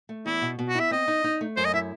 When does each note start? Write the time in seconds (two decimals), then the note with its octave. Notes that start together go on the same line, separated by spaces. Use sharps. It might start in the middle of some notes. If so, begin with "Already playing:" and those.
0.09 A3
0.26 E2 E4
0.41 B2
0.59 B2
0.69 F#4
0.75 E4 E5
0.91 C4 D#5
1.08 D#4
1.24 D#4
1.41 A3
1.56 F#2 C5
1.65 D#5
1.74 E4 E5